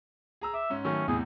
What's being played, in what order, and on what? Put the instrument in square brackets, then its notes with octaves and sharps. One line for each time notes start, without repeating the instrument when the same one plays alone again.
[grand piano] G#4 A#5 E6
[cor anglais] E5 [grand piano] D6
[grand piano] G#2 C#4
[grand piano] D#3 F#3 A3 [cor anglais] C#4
[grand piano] E2 A2 C3 [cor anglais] G#4